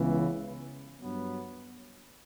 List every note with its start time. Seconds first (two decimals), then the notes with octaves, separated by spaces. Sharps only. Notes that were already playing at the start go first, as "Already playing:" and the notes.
Already playing: C#2 C#3 E3 B3
1.01 G2 F#3 B3